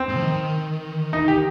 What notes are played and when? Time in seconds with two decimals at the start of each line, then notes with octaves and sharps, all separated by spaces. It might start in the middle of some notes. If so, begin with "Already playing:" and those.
Already playing: C4
0.09 G#2
0.17 F3
0.22 D#3
1.13 D#4
1.28 G4